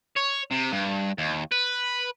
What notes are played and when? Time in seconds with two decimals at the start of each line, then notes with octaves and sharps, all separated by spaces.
0.17 C#5
0.52 C3
0.72 G2
1.18 D#2
1.52 B4